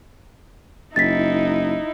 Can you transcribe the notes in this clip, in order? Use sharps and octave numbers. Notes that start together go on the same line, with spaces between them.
F#1 D#4 E4 A6 B6